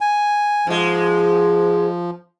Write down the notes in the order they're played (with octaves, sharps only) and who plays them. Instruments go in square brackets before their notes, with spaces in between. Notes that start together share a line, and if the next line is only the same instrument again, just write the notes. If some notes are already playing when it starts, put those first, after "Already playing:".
[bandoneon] G#5
[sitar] G#2 G#3 [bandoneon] F3